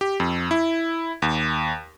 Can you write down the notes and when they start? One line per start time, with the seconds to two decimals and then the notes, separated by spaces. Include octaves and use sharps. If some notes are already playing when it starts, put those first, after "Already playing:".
0.01 G4
0.20 F2
0.51 E4
1.22 D#2